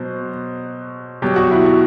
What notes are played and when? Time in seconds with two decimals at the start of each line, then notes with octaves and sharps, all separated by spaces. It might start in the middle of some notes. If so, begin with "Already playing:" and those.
Already playing: B2 F#3 C5
1.22 B2 F#3 G4
1.36 F#4
1.51 E4
1.66 F#4